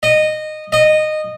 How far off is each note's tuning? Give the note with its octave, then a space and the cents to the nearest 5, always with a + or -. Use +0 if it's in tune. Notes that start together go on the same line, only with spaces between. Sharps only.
D#5 -15
D#5 -15